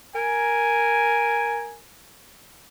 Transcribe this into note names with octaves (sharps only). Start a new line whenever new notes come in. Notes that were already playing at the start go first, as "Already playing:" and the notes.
A#4 G#5